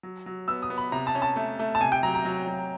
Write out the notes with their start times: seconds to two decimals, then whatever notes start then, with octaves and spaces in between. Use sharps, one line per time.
0.03 F#3
0.26 F#3
0.48 B3 E6
0.62 D#6
0.70 B3
0.78 B5
0.92 C3 A#5
1.07 A5
1.15 C#4
1.22 A5
1.36 A3
1.59 A3
1.75 A5
1.81 C3 G#5
1.92 G5
2.03 F#3 A#5
2.15 A#5
2.25 F#3
2.47 F#3